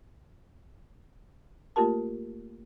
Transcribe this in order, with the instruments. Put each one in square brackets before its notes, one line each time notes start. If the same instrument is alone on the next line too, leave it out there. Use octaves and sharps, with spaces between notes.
[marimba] A3 A#3 F4 G4 A#4 A5